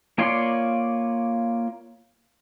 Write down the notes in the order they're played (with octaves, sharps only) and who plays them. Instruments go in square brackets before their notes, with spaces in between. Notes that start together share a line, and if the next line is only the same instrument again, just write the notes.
[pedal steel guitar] A#3 F4 C#5 D5 C6